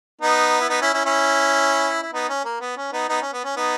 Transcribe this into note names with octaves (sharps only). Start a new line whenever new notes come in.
B3 D#4
E4
B3 D#4
C#4 E4
C#4 E4
C#4 E4
E4
B3 D#4
C#4
A#3
B3
C#4
B3 D#4
B3 D#4
C#4
B3
C#4
B3 D#4